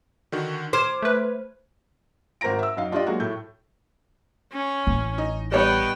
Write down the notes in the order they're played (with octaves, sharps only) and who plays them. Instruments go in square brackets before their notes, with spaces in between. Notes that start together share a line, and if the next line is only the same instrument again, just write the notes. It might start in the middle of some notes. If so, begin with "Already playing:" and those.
[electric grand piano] D3 D#3 F#4
[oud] C5 [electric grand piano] D6 F6 G#6
[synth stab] A3 B4
[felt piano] G#1 A#4 C5 A#5 A#6 D7
E5 E6
F#2 D#4 F5
D4 F4 G4 D5 D#5
F#3 G#3 A#3 F#4
A2 A3 G6
[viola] C#4
[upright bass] A1
[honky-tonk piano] D#4
[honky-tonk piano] G3 D#4 C#5 [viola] B3 G5